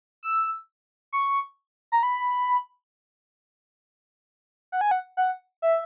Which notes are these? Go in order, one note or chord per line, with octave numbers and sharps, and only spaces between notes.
E6
C#6
A#5
B5
F#5
G#5
F#5
F#5
E5